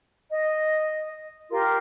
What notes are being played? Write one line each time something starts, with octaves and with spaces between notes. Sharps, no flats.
D#5
F4 G4 A#4 C6